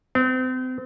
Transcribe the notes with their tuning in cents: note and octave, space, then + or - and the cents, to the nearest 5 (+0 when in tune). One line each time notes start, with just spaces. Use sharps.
C4 -35